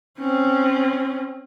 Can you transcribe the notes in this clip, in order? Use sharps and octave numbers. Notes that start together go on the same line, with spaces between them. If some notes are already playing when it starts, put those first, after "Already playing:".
C4 C#4